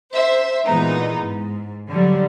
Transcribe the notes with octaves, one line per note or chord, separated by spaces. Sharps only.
C5 E5
A#2 E3 G#3 B3 D#4
G#2
D3 F#3 G3